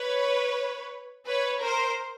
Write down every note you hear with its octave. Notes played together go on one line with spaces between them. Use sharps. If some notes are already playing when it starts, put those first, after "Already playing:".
Already playing: B4 C#5
B4 C#5
A#4 C5